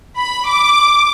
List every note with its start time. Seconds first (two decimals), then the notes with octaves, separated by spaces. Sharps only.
0.18 B5
0.47 D6